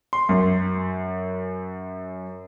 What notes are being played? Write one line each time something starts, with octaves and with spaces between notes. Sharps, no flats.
C6
F#2